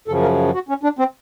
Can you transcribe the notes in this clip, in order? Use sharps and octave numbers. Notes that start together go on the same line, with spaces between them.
F#2 C#3 F3 A4
A#4
F#4
C#4
D4
C4